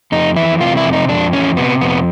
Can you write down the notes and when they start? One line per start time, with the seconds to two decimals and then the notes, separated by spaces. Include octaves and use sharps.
0.12 F2 D#4
0.36 E3 E4
0.61 C3 F4
0.77 E4
0.85 F2
0.93 D#4
1.09 F2 D4
1.33 E3 C#4
1.57 C3 B3
1.81 F2 B3